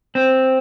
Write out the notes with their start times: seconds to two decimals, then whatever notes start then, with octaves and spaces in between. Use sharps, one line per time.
0.15 C4